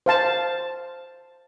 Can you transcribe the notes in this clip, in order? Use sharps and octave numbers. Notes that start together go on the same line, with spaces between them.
C5 F5 A5